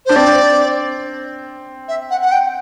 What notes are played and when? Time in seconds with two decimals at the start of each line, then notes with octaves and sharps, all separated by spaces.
0.05 D4 C5
0.16 C4 D5
1.88 E5
2.10 F#5
2.21 F#5
2.31 G5